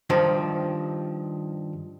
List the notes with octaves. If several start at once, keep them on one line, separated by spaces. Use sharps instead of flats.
G2 D#3 F3